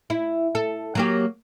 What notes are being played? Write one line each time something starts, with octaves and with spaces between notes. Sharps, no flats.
E4
A4
F#3 A#3 G4